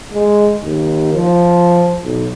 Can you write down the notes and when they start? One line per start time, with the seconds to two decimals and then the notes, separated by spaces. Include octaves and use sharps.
0.13 G#3
0.63 D#2
1.14 F3
2.04 B1